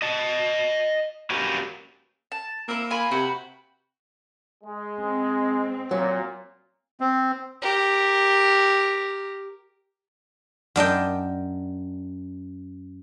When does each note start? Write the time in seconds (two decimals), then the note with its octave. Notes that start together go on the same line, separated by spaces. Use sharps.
0.02 D#5 A5
1.30 A#3 C#4 F#4 G4 A#4 B4
2.32 A5
2.68 A#3 C4 E4
2.91 F4 G#5 B5
3.11 C3 F#4 B4 G5
4.64 G#3
5.00 C4
5.91 A#2 F#3
7.00 C4
7.62 G4 A#4
10.76 F#2 D4 D#5 G5